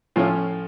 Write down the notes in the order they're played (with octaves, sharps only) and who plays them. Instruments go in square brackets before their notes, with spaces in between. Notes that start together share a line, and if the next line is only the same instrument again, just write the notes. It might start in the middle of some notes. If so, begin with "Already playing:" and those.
[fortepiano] A2 F3 A3 C#4 F4